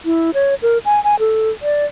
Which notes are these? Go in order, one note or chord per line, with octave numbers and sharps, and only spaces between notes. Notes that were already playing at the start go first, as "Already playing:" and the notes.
E4
C#5
A#4
G#5
G#5
A4
D5